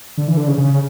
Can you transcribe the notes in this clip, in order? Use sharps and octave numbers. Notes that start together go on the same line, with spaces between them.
D3
E3
D3
C#3
C#3